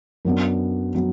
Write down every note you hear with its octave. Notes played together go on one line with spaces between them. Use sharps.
F#2 F#3 B3 D4
F#3 B3